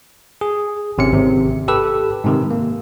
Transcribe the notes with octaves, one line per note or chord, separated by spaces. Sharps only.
G#4
G#1 C3 C#4 C#7
G#1 C3
G4 A4 B4 E6
G#2 C3 D#3
A#3